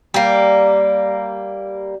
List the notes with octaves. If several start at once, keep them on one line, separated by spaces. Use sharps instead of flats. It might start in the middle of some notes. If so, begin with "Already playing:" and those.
G3 A#3